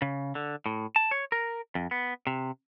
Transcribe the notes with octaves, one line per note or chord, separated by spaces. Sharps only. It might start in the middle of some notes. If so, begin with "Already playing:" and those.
C#3
D3
A2
A5
C#5
A#4
F2
B3
C3